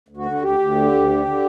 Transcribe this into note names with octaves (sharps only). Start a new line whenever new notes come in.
D2
F#4
D3
D2 G4
D2
D3
D2
D3
D3